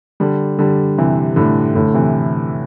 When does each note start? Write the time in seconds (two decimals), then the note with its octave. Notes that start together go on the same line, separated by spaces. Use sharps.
0.20 D3 G3
0.59 D3 G3
0.98 C3 E3
1.36 A2 D3
1.75 A2 D3
1.94 C3 E3